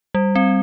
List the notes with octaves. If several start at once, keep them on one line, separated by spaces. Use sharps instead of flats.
G3
C4